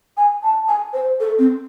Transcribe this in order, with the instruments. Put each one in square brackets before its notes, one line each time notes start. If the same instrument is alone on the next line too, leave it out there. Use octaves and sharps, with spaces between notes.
[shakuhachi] G#5
A5
G#5
C5
A4
C4